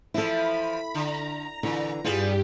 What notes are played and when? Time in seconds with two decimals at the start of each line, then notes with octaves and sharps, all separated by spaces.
0.14 E3 F3 E4 A4 B5
0.94 D3 A#5
1.63 A#2 D3 E3
2.04 G2 G3 B3 F4 G4 G#4